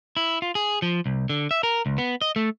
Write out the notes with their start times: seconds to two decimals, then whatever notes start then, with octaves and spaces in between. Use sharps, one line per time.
0.17 E4
0.42 F4
0.55 G#4
0.82 F3
1.06 C2
1.29 D3
1.51 E5
1.63 A#4
1.86 C#2
1.98 B3
2.21 D#5
2.36 A3